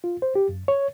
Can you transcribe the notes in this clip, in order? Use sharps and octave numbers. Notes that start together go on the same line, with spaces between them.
F4
C5
G4
F#2
C#5